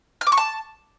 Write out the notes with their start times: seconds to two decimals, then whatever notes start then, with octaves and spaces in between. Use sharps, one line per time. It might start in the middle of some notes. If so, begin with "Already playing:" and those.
0.21 F6
0.27 D6
0.32 C#6
0.37 A5